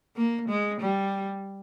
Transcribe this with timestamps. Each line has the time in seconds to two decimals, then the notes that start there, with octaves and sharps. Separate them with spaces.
0.16 A#3
0.49 G#3
0.80 G3